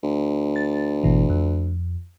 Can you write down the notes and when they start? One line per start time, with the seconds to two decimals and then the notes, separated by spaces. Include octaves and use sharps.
0.03 D2
0.56 A6
1.04 G#1 B2 E3
1.30 F2